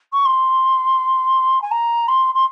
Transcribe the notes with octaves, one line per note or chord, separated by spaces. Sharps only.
C#6
C6
G#5
A#5
C6
C6